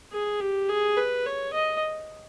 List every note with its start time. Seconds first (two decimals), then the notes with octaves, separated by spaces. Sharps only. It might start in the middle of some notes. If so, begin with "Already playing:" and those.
0.12 G#4
0.40 G4
0.69 G#4
0.97 B4
1.26 C#5
1.53 D#5